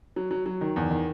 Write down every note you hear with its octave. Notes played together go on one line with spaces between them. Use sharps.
F#3
F#3
F#3
D#3
E2
D#3